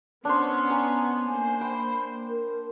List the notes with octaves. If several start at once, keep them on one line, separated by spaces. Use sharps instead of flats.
B3 C#4 D4 C5
G#5 A#5
A#3 C5 G#5
G5 B5
A#4